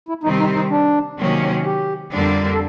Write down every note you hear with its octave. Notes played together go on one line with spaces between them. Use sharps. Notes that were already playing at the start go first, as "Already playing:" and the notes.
E4
C3 D#3 G3 C4 D#4
D#4
D#4
D4
C3 D#3 F#3 A#3 C#4
G4
F2 D3 G3 A#3 D4
A4